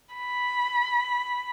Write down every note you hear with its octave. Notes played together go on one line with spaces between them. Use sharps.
B5